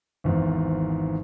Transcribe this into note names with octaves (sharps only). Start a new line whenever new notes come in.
G#1 E2 G#2